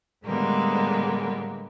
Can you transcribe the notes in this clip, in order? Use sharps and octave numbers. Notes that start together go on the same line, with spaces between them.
A2 D3 G3 G#3 A#3 B3